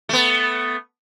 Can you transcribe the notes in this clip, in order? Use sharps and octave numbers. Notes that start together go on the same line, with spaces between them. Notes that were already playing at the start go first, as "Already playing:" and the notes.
A3 B3